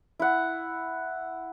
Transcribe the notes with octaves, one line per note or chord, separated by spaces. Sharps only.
E4 F#5